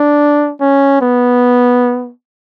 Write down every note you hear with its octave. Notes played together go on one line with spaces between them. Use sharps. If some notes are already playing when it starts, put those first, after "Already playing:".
Already playing: D4
C#4
B3